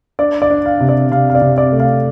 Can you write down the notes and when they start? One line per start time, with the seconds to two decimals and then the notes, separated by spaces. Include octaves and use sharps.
0.19 D4 D5
0.42 D5
0.50 D4
0.66 F5
0.80 C3
0.89 D5
1.11 C3 F5
1.30 F5
1.35 D5
1.41 C3
1.58 D5
1.72 A3
1.80 F5